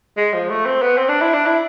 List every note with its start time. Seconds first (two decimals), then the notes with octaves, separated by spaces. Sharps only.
0.17 G#3
0.33 F3
0.49 A3
0.66 C4
0.82 B3
0.98 C4
1.09 D4
1.21 E4
1.34 D4
1.46 E4